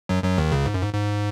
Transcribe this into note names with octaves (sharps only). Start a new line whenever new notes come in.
F#2 F#3
F#2 F#3
D#2 D#3
C#2 C#3
G#2
F#2
G#2
G#2